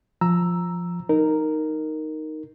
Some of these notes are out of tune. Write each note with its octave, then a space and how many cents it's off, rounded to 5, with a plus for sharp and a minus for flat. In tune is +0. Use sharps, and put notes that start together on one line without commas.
F3 +0 A#5 +0 E6 +0
D#4 +0 A#4 -5